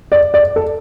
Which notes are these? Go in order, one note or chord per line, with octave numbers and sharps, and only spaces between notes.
D5
D5
A4